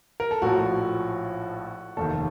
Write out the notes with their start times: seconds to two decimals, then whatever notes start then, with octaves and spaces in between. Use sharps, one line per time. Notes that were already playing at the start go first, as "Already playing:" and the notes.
0.20 A#4
0.31 A4
0.42 A#1 A2 F3 F#4
1.97 F1 D#2 D#3 A4